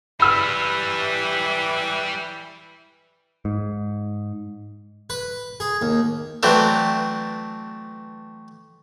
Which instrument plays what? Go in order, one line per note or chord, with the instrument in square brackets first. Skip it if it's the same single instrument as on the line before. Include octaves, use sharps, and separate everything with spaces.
[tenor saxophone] E3 [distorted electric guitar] G3 B4 [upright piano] B5 E6 F6
[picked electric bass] G#2
[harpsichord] B4
G#4
D#2
E3 F#3 A3 C4 D4